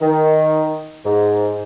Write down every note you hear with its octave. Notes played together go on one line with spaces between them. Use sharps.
D#3
G#2